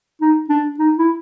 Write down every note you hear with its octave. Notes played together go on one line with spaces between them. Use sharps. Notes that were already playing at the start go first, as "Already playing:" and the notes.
D#4
D4
D#4
E4